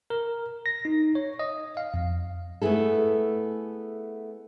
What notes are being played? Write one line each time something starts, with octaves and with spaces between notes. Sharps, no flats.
A#4
A#6
D#4
C#5
D#5
F5
F2
A3 B3 E4 G#4 A4